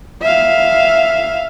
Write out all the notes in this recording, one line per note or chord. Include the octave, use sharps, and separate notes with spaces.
E5 F5